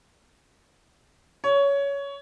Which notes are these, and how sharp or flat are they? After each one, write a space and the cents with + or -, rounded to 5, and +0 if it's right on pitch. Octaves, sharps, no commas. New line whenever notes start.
C#5 +15